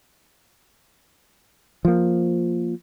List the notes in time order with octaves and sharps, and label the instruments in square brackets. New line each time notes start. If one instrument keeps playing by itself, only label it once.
[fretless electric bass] F3 A#3